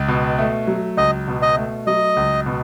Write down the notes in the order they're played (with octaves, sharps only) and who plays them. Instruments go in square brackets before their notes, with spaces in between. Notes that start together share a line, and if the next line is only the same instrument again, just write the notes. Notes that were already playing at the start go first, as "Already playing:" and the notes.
Already playing: [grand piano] C#2
B2
A3
F#3
[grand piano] C#2 [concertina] D#5
[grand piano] B2
[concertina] D#5
[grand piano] A3
[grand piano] F#3 [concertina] D#5
[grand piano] C#2
B2